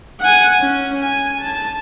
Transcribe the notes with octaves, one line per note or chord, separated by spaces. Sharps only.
F#5 G#5
C#4
G#5
A5